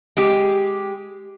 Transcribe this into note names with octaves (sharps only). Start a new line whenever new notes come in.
G#3 G4